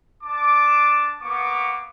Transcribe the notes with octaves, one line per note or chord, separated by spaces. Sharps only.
D4 A5 D6
A#3 B3 C#6 D6